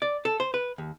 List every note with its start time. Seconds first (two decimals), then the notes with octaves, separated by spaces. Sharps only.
0.02 D5
0.25 A4
0.40 C5
0.54 B4
0.78 D#2